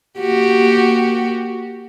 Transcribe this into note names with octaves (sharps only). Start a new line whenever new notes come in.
A#3 F#4 G4